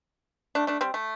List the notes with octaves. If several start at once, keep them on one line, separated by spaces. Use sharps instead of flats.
A3 D4
A3 D4
G3 C4
A3